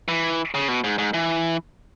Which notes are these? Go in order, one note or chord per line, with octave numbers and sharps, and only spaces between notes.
E3
C#3
B2
G#2
G#2
E3